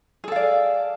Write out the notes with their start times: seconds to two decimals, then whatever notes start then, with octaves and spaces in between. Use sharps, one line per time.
0.24 G#4
0.28 A4
0.32 F5
0.36 D5